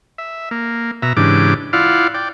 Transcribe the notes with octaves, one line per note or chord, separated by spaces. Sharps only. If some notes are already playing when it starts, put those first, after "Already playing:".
E5
A#3
B2 E5 A#5
G#2 C#3 E3 D4 G4 D6
E4 F4 D5 F5 F#5
D5 G5